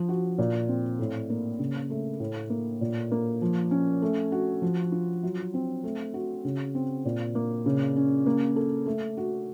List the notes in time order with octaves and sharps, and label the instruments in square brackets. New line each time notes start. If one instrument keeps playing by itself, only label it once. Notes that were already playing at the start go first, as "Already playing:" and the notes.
Already playing: [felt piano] F3
F#4
A#2
C4
A2
A#3
C#3
A3
A2
A#3
A#2
A#3
F3
C#4
A3
F#4
F3
F4
F#3
C4
A3
F#4
C#3
C4
A#2
A#3
C#3
C#4
A#3
A4
A3
F#4